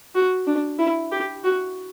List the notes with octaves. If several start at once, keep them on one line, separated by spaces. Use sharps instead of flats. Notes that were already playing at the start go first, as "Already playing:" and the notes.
F#4
D4
E4
G4
F#4